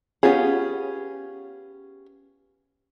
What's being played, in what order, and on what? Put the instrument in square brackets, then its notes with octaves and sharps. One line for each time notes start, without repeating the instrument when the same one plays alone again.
[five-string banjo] B3 C#4 F4 G4 G#4